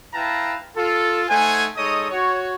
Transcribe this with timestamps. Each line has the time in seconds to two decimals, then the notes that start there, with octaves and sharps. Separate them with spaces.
0.14 E4 B4 F5 G5 A5 A#5
0.77 F4 A4
1.29 A3 D#4 C5 F#5 G#5
1.77 G#3 D#4 A4 C#5 D#5 D#6
2.11 F#4 C#5